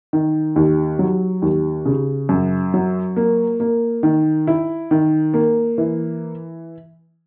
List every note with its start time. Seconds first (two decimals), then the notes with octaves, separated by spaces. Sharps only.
0.13 D#3
0.56 D#2
0.99 F#3
1.42 D#2
1.86 C#3
2.29 F#2
2.74 F#3
3.16 A#3
3.60 A#3
4.03 D#3
4.47 E4
4.91 D#3
5.34 A#3
5.78 E3